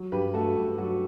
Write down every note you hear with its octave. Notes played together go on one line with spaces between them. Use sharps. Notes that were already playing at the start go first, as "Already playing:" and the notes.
Already playing: F#3
G2 G4 B4
A3 F#4 A4
G2
F#3 F#4